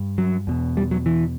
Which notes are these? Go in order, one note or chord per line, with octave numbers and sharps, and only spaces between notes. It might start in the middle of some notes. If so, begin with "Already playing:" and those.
Already playing: G2
F#3
E2 B2
G3
F#3
E3